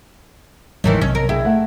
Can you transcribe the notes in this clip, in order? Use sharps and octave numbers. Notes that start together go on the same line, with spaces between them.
G#1 E2 A2 D#3 E3 F#3 C#5 D#5
B1 C3 C#4
A#4
D3 E4 G#4 G5
A3 F#5